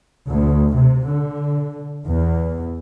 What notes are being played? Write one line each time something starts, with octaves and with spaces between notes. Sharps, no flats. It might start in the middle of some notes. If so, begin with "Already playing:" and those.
D2
C3
D3
E2